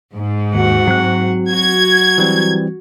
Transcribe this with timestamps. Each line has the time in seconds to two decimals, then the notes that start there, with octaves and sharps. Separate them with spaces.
0.14 G#2
0.54 D#2 F#4 F#5
0.87 F#3 C4 F#6
1.50 F#4 G#6
2.18 E3 G3 C4